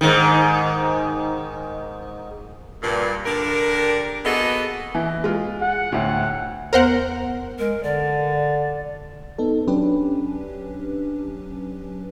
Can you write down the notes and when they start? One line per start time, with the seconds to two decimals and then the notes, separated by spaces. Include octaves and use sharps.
0.01 G#2 D#3
2.83 G2 A#2
3.25 D3 D4 G4 A#4
4.25 A#3 B3 F#4 G#4 A4 D#5
4.95 E3
5.24 G#3 F4
5.62 F#5
5.92 D2 A2
6.73 E2 B3 A#4 C5 F#5
7.59 G#3 A#4
7.83 D3 D5
9.38 B3 D#4 A4
9.68 F#3 C#4 D4 G4 B4